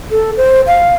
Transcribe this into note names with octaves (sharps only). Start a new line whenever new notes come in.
A4
C5
F5